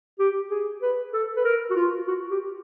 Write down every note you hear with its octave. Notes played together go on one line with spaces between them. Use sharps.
G4
G#4
B4
A4
B4
A#4
F#4
F4
F#4
G4